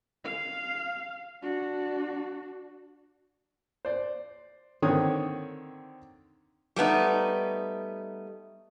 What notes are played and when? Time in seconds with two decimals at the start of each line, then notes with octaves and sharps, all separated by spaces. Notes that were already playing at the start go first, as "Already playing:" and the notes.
0.25 F5
1.43 D4 F#4
3.85 C5 D5
4.82 D3 D#3 C4 C#5 D#6
6.76 G3 A3 B3 D#4